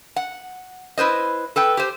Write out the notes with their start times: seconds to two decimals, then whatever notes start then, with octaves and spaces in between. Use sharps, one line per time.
0.16 F#5
0.98 E4 B4 C5 D#5
1.56 A4 B4 G5
1.77 G4 C5